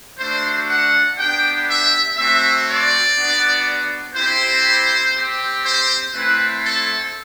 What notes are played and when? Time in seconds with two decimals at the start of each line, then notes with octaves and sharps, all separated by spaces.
0.19 A3 D4 F#4 C5
0.69 F#5
1.17 B3 D4 G4 G5
1.68 E5
2.17 A3 C4 F#4 E5
2.67 D5
3.17 B3 D4 F#4
4.15 C4 E4 G4 C5
5.15 C4 G4
5.64 C5
6.14 A3 C4 E4 B4
6.63 A4